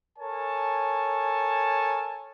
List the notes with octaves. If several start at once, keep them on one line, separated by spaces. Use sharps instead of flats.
A4 A#4 C#5 G#5 A5